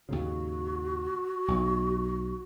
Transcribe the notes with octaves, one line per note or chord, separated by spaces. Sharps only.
D#2 G#2 C#3 F#4
B1